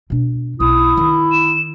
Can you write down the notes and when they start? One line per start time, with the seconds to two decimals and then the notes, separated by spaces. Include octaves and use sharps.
0.10 B2 D4
0.60 B1 E4 D#6
0.97 D3 D#3
1.32 E7